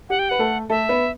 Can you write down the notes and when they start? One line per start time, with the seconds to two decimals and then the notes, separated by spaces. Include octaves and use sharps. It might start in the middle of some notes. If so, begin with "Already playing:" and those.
0.09 G4 F#5
0.19 G5
0.29 B4 F#5
0.39 A3 A4
0.70 A3 A4 E5
0.89 B3 B4